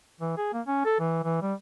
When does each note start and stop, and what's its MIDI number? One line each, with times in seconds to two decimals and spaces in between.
0.21 0.32 52
0.37 0.52 68
0.53 0.61 58
0.66 0.81 61
0.85 0.96 69
1.00 1.19 52
1.23 1.41 52
1.42 1.53 55